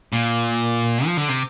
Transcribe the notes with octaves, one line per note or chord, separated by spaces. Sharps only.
A#2
F3
D3
C3